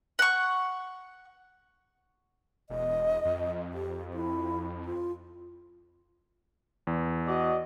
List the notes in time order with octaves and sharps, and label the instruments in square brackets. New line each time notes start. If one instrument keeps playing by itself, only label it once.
[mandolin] F#5 C#6
[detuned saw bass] E1 [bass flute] D#5
[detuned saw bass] F2
[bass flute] G4
E4
F4
[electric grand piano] E2
[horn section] F#4 D5 D#5